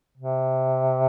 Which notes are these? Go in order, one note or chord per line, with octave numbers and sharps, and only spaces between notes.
C3